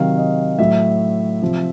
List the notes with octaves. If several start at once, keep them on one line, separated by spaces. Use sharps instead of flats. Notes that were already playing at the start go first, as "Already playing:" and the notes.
Already playing: C3 D#3 F#3 F5
D#5
A2 F#3 E5
C3 F3